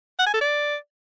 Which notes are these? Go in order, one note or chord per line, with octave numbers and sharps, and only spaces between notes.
F#5
G#5
A4
D5